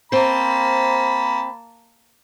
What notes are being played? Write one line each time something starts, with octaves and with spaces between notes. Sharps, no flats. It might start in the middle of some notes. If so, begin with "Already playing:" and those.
A#3 C4 C5 A5 B5